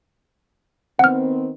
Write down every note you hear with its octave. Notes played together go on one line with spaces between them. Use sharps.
D#3 B3 C4 F#5 F6